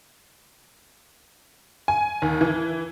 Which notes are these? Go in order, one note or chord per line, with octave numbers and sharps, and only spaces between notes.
G#5
D#2
E3